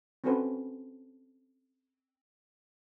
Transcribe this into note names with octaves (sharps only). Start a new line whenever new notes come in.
C4 C#4 F#4 A4 B4 C5